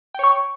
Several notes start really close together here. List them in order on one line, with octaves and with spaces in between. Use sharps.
G5 C#5 C#6